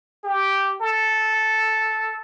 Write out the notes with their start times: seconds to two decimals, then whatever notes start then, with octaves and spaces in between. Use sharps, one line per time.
0.24 G4
0.81 A4